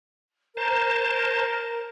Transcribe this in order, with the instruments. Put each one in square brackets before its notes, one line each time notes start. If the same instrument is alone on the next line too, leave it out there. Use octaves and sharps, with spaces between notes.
[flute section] A#4 [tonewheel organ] C5 A5